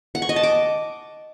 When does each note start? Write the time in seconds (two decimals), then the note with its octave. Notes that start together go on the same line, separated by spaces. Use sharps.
0.15 F#5
0.22 C#6
0.29 D#5
0.36 A5
0.43 D6